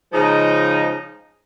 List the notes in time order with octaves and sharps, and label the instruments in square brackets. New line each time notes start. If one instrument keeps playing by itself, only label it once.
[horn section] C#3 F3 G#3 D#4